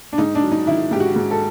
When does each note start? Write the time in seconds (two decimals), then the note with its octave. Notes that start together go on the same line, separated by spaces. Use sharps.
0.13 D4
0.18 G#2 D#4
0.35 D4
0.43 F#3
0.52 D#4
0.67 D#3 E4
0.91 G#2 G4
1.00 F#4
1.16 G#2
1.31 A4